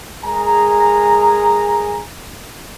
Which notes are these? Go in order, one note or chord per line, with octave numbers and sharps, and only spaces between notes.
G#3 G#4 A#4 G#5 A#5